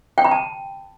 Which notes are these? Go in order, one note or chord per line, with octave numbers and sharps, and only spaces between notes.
G5
B5
A5